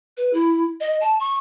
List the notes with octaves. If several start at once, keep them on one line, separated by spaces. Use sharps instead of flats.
B4
E4
D#5
A5
C#6